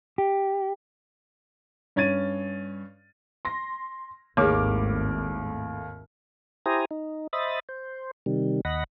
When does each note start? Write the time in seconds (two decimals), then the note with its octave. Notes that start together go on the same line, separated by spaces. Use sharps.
0.18 G4
1.96 G2 C#4 G#6 A6 D#7
3.45 C6 A#6
4.37 G#1 D#2 A2 G#4 C#5 D6 F6
6.66 E4 G4 C5 G#5 A#5 D#6
6.91 D#4
7.33 C5 D#5 E5 B5 D#6 A6
7.69 C5
8.26 C3 D#3 G3
8.65 D#2 D#5 F#5 B5 A#6